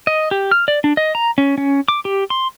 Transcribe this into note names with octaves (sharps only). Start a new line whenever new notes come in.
D#5
G4
F6
D5
D4
D#5
A#5
C#4
C#4
D6
G4
C6